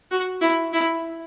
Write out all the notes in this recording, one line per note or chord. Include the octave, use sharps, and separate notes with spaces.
F#4
E4
E4